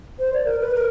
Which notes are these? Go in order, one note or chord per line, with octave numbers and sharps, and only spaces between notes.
C5
D5
A#4
B4
A#4